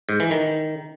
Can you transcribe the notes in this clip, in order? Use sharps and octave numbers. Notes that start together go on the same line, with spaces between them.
G#2
E3
D#3